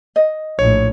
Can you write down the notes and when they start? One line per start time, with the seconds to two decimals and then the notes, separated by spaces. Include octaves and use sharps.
0.16 D#5
0.59 A#1 A2 C#5